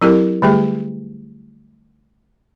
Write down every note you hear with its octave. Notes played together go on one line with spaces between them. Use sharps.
F#3 C4 E4 G4 A4 A#4
D3 G3 A3 G4 G#4